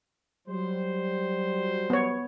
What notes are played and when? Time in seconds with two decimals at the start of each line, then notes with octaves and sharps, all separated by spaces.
0.48 F#3 G3 C5
1.90 B3 C#5